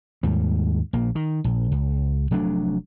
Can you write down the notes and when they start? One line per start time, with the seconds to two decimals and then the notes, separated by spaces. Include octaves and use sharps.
0.23 D#2 G#2 G3
0.93 A#1 A#3
1.15 D#3
1.44 A#1
1.72 C#2
2.31 F1 F#3 A3 D4